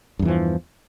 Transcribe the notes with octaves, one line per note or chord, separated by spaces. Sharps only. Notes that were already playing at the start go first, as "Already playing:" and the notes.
E2 G2 E3 F3